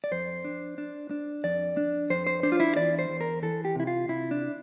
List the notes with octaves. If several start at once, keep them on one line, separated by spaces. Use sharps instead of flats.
D5
F2 C5
D4
D4
D4
F2 D5
D4
F2 C5
C5
D4 C5
F4
E4
E2 D5
C5
E2
A#4
E3 A4
G4
C3 E4
F4
C3 E4
D4